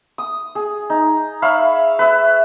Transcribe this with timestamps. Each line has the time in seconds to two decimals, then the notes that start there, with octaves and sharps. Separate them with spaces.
0.18 D#6
0.55 G#4
0.90 D#4
1.42 C#5 E5 F5 B5
1.99 B4 E5